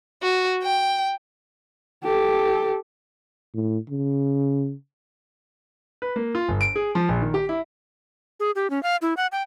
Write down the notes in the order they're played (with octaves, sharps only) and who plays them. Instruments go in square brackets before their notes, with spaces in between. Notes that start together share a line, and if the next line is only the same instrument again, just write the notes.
[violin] F#4
G5
[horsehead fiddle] G4 A4
[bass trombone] A2
C#3
[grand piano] B4
A#3
F4
G1
D7
G#4
F3
A#1
D#3
G4
E4
[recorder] G#4
G4
C#4
F5
E4
F#5
G5